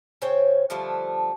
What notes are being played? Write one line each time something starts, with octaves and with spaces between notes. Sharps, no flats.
C#3 C5 C#5 G5
D3 F3 G3 A3